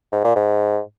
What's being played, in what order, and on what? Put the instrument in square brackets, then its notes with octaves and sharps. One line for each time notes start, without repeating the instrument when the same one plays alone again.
[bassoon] G#2
A#2
G#2